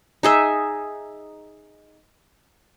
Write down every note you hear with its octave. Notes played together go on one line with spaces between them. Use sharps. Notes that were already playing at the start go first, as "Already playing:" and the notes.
D#4 G#4 E5